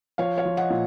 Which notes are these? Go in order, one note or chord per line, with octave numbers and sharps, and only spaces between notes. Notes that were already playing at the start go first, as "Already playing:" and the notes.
F3 C#5 F5
C#5 F5
F3
D#5 F#5
A#2